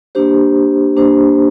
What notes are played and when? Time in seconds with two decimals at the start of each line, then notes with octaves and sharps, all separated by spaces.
0.15 A#3 D4 G4 C5
0.97 A#3 D4 G4 C5